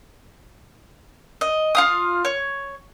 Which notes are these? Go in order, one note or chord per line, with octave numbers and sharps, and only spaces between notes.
D#5
F4 F5 D#6
C#5